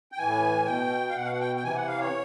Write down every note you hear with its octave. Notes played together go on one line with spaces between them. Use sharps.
G5
A2 E3 G#5
B2 G5
F5
B2 F#5
F5
F#5
G5
G5
C3 E3 G#5
F#5
F5
C#5